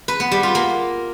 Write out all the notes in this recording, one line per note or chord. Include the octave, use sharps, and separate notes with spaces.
B4
B3
G3
F4
A#3